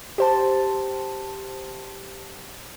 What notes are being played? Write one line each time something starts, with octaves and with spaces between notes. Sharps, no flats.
G4 C5 A5